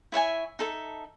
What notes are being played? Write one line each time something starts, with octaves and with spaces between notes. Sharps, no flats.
E4 C#5 E5 G#5
D#4 A4 E5